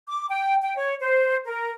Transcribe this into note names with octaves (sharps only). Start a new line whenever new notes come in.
D6
G5
G5
C#5
C5
A#4